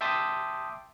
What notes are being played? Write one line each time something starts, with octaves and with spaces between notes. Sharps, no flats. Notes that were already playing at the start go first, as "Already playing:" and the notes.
E5 G5 A5 C6 D6 D#6